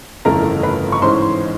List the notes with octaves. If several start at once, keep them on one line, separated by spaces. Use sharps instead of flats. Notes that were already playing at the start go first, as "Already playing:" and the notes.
G1 F2 C#3 E3 A3 A#4 A#5
B4 B5
C#6
G#2 E3 G#3 C#4 C5 C6